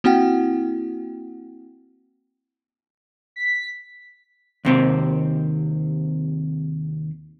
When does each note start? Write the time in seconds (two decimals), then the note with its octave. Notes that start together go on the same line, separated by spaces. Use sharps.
0.04 A#3 C4 E4 F#4 F#5 G5
3.36 B6
4.65 D#2 C3 C4